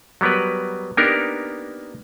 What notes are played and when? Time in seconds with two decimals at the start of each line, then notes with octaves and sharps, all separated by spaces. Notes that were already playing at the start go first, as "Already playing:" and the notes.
0.21 F#3 G3 B3 A#4 B4
0.97 A#3 B3 D4 D#4 G4 A#4